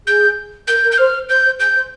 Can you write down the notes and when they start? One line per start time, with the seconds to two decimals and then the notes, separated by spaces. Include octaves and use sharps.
0.06 G#4 G6
0.67 A#4 G6
0.83 A#4
0.92 G6
0.98 C5 F6
1.29 C5 G6
1.44 C5
1.59 G#4 G6
1.75 C5